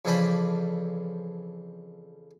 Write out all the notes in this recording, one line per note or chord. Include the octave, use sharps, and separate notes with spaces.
F2 C#3 E3 D4 C5 B5